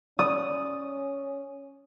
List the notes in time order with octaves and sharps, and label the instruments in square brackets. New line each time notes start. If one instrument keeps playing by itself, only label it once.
[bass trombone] C#4 [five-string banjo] D5 [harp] D#6